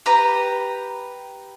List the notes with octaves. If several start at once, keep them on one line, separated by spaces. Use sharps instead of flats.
G4 B4 A#5